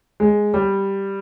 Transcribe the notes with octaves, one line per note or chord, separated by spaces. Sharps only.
G#3
G3